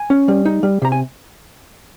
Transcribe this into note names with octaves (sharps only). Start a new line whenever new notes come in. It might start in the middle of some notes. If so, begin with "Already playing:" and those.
Already playing: G#5
C#4
G3
D#4
G3
C3 A#5
G#5